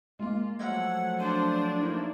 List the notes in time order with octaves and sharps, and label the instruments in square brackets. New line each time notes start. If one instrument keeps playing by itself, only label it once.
[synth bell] G#3 A#3 [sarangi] F4
[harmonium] F3 F#3 A3 [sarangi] F#5 [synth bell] E6 G#6
[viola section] D4 [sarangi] C5 [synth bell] D#7
[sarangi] A#3 [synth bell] D#4 E4